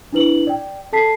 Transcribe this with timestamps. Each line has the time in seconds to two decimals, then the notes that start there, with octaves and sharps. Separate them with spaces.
0.13 D4 E4 B4 F#7
0.47 D5 G5
0.93 A4 A5 B6 C7